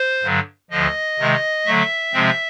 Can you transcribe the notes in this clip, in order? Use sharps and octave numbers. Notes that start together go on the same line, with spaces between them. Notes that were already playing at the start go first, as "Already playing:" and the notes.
Already playing: C5
G2 D3 F#3
D2 D3 F3 D#5
C3 D#3 G#3
D3 F#3 A3 E5
C3 F3 G#3 C4